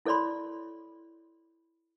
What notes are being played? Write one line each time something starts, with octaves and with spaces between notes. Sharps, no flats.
E4 A4 C#5 D5 B5 C6